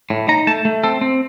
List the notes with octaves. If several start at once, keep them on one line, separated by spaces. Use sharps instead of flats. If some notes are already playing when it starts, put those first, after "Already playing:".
A2
D#4 A#5
A3 A5
A3
C4 A4
C4